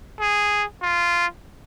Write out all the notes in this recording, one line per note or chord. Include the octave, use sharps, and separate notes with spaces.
G#4
F4